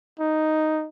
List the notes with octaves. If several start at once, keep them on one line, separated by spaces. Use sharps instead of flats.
D#4